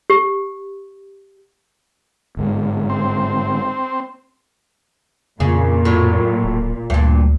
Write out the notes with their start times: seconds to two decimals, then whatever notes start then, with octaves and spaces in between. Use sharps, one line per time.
0.10 G4
2.37 G1 G#2
2.90 C4
5.40 F2 A#2 C#3
5.85 A2 F#3
6.44 D1
6.90 D2 G2 A#2